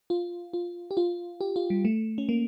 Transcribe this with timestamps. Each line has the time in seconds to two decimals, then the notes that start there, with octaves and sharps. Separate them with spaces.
0.10 F4
0.53 F4
0.91 G4
0.97 F4
1.41 G4
1.56 F4
1.70 G3
1.85 A3
2.18 C#4
2.29 A#3